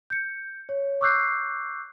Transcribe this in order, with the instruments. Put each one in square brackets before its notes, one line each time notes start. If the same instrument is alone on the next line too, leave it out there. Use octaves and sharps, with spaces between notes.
[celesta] G6 C#7
C#5
C#6 D6 E6 F#6 G6 C7